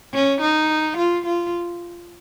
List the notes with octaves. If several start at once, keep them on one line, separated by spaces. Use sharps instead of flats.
C#4
D#4
F4
F4